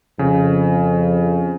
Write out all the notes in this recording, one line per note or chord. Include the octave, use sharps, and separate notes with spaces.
F2 C#3